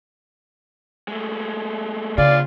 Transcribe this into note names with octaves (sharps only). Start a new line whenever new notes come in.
G#3 A3
A#2 C#3 F4 G#4 D5